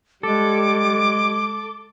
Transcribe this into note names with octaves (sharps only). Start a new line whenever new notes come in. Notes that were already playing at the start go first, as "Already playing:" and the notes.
G3 G#3 A4 D6